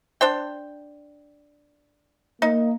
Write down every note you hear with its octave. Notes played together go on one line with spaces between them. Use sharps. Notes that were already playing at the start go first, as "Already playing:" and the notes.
D4 C5 G5
A#3 D#4